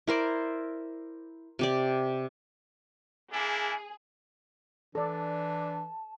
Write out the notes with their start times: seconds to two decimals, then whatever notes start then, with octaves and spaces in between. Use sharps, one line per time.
0.07 E4 A#4 C5 D5
1.59 C3 G4 D5
3.32 A#3 D4 E4 G#4
4.95 E3 D4 A4 D5 A5